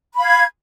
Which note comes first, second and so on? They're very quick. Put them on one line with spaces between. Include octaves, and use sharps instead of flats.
B5 F5 G#6